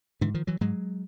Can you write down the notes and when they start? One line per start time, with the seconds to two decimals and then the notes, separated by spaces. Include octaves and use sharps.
0.21 G#2 D3 E3
0.34 D#3 F3
0.47 E3 F#3
0.61 G#2 F#3 G#3